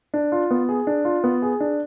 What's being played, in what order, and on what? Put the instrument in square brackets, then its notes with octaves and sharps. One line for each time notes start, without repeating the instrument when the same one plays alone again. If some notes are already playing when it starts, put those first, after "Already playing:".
[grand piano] D4
F4
B3
G#4
D4
F4
B3
G#4
D4